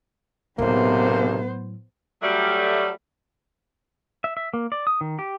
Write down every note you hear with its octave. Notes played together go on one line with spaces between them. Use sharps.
B1 A2 C3 F#3 A#3 B3 C5
F#3 G3 A3
E5
E5
A#3
D5
D#6
D#3
G4